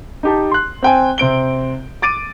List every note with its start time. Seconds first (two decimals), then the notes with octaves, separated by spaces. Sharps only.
0.23 D#4 G4 A5
0.51 C6 F#6
0.83 C4 G5 G#5
1.18 C3 C4 D7 G7
2.02 D6 A6 D7 D#7